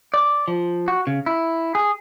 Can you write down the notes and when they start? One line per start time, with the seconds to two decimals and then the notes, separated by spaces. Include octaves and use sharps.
0.14 D5
0.48 F3
0.88 F#4
1.07 C#3
1.26 E4
1.75 G#4